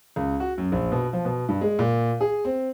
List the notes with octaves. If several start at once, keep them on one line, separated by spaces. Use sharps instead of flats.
C#2
F#4
F#2
A#1
B2
F3
B2
G2
G#3
A#2
G#4
C4